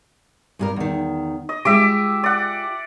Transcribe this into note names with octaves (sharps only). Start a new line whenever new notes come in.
G2 G#4 A#4
E2 D#3
D#5
G#3 F4 G4 E5 D6
D5 F#5